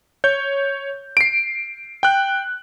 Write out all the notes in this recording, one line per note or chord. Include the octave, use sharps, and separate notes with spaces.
C#5 G6
C7 D7
G5 F#6